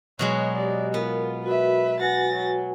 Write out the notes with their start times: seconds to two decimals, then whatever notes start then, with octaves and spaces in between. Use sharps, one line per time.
0.19 B2 F#3 G#3 C#5
0.55 G4 D5 D#5
0.94 B3 F4 A#4
1.44 F#4 A#4 B4 E5
2.00 F#4 B4 F#5 G#5 A6 A#6
2.34 F#3